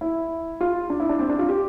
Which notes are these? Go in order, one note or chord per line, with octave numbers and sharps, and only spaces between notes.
E4
F4
D4
E4
D4
C4
D4
F4
G4